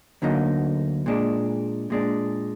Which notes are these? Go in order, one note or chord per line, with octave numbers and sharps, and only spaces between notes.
D2 D3 F#3 A#3 D#4
A#2 G#3 D4
A#2 G#3 D4